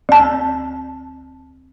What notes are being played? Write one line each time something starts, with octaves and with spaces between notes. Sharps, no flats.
D2 A5